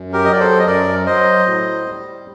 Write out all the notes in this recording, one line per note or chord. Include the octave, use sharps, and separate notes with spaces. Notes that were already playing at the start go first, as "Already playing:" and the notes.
Already playing: F#2
G4 A#4
F#3 D#5
D5
A4 C5
D#5
F#2 A#4 D5
F#3 C5 D#5
A2
G3